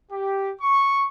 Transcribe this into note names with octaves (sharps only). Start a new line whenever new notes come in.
G4
C#6